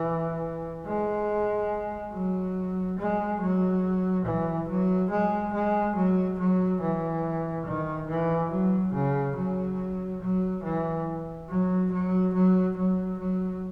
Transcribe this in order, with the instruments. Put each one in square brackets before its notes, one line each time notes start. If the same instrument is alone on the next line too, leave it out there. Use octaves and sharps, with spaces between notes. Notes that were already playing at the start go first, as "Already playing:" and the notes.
Already playing: [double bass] E3
G#3
F#3
G#3
F#3
E3
F#3
G#3
G#3
F#3
F#3
E3
D#3
E3
F#3
C#3
F#3
F#3
E3
F#3
F#3
F#3
F#3
F#3